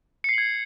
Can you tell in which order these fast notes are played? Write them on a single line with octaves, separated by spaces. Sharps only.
C#7 C7 F#7 G#6